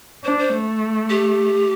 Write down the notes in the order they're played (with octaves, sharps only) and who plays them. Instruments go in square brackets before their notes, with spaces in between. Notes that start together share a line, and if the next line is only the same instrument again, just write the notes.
[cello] D4 [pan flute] C5
[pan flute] C5
[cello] A3
[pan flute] G4